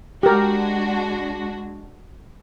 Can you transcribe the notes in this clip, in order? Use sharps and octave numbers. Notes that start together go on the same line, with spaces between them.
G#3 D4 F#4 G4 A#4